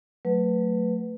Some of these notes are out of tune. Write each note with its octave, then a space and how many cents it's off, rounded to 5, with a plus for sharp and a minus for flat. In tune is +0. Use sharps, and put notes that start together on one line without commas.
F#3 +0 A3 +20 B4 +0